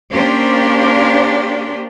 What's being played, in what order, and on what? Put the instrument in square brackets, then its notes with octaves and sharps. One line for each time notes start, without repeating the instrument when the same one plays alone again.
[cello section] A#3 C#4 D4 G4 C5